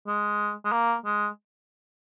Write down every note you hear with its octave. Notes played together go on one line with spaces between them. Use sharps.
G#3
G#3
A#3
G#3